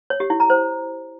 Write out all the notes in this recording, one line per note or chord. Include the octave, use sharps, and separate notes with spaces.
C#5
G4
E4
A#5
C5